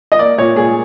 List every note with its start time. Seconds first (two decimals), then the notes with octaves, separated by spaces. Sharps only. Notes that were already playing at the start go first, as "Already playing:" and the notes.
0.12 D#5
0.19 A#3 D5
0.38 A#2 C#5
0.56 A#2 G#4